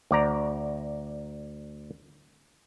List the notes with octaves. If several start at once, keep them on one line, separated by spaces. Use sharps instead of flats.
D2 D5 A#5